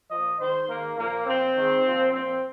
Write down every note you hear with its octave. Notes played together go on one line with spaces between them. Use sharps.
A#2 F3 D#5
G#2 D#3 C5
G#2 D#3 A#3
A#2 F3 A#3
A#2 F3 C4
G#2 D#3
A#2 F3
A#2 F3 C4